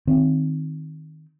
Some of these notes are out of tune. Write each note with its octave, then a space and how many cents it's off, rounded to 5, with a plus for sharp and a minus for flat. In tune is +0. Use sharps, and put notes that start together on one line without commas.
D#3 +0 C4 +0